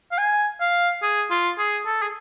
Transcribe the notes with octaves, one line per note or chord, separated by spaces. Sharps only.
F5
G#5
F5
G#4
F4
G#4
A4
G#4